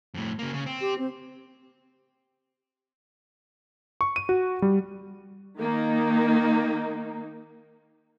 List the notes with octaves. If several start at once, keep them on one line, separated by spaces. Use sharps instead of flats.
F2 A2
C#3 A#3
C#3
C4
G4
C4
C#6
D#7
F#4
G3
D#3 A#3 D#4